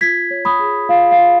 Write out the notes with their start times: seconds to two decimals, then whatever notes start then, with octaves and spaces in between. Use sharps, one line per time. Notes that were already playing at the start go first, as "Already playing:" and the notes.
0.01 F4 G#6 B6
0.31 C#5
0.45 B5 D#6
0.59 G#4
0.89 F4 F5
1.11 F5
1.19 F4